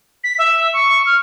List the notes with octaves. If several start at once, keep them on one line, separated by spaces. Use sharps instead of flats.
B6
E5
C#6
F6